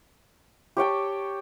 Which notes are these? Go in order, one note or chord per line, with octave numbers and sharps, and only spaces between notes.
G4 C#5 G5 A5